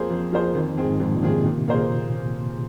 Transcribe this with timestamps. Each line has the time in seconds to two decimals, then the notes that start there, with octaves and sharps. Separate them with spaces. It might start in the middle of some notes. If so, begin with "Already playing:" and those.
Already playing: F2 F3 A#3 G#4 C5
0.10 F2
0.33 F3 A#3 G#4 C5
0.55 F2 D#3
0.77 D#3 C4 G#4
0.85 G#2
1.00 F2 G#2
1.15 A#2
1.23 D#3 C4 G#4
1.31 C3
1.45 A#2 D#3
1.57 C3
1.68 A#2 A#3 G#4 C5